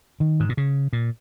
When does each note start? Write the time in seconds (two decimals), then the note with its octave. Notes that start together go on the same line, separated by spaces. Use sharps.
0.20 D#3
0.40 G#2
0.49 A#2
0.57 C#3
0.93 A#2